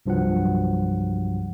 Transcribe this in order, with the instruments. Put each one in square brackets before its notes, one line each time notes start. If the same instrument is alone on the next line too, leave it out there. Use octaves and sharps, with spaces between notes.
[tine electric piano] C2 G2 F3 F#3 F#5